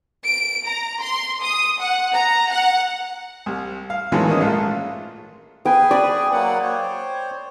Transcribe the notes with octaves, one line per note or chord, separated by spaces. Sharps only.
D7
A#5
C6
D#6
F#5
A#5
F#5
C2
F5
D#3 E3 F#3 G#3 A3 B3
D#3 A#3 C#4 D#5
A#1 G#2 A3 F4
G#4 B4 G5 G#5
D5 B5 D#6
F#3 A#3 F#5
C5 C#5